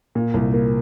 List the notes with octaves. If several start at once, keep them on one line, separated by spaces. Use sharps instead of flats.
A#2
C2
A#3